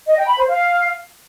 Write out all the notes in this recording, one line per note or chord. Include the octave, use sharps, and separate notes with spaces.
D#5
G5
B5
C5
F5